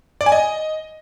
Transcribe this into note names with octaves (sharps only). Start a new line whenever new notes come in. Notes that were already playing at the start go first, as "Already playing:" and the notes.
D5
G#5
D#5